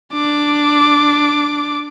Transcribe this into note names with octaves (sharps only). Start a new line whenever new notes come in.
D4 D6